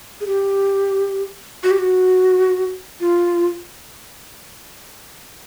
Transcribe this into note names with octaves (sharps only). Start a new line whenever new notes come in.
G#4
G4
F#4
G4
F#4
F4